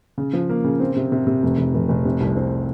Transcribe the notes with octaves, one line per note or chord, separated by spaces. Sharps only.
C#3
F3
A#3
C#3
C4
C3
C3
C3
F1
F1
F1
F1
C3
C2
C4